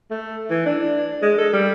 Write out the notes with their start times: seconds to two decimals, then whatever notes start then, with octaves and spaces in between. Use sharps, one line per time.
0.10 A3
0.50 E3
0.66 D4
1.22 G#3
1.38 A4
1.53 G3